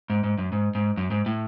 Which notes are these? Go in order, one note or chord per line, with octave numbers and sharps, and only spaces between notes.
G#2
G#2
F#2
G#2
G#2
F#2
G#2
A2